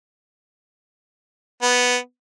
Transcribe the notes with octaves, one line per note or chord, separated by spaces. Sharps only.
B3